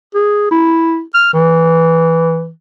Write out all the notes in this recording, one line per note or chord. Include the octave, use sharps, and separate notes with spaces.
G#4
E4
F6
E3